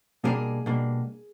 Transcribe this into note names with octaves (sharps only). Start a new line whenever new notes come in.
B2 G3 A#3 D4 G#4 A#4
B2 G3 A#3 D4